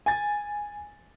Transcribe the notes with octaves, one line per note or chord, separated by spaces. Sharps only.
G#5 A6